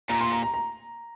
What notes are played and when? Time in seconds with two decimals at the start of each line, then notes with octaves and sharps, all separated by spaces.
0.09 A#2 A#5
0.21 C6
0.32 A#5
0.43 A#5
0.54 A#5